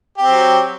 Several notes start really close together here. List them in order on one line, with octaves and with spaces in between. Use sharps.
G4 C4 F#3